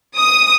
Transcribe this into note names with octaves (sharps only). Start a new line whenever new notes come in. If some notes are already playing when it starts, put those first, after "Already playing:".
D#6